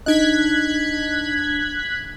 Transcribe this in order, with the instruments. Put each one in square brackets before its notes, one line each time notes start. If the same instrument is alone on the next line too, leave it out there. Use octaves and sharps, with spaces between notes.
[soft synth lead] D4 [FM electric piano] D#4 D#5 [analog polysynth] F#6 G#6 B6